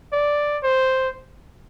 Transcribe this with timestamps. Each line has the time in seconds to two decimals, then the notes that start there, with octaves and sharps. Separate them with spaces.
0.12 D5
0.63 C5